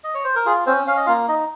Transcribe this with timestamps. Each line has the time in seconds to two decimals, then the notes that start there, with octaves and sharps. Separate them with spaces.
0.04 D#5
0.15 C#5
0.24 C5
0.36 A#4
0.46 F4 G#4
0.66 C4 C#4 C5
0.87 C#4 F5
0.97 D#5
1.06 A#3 F4 F5
1.28 D#4 D#5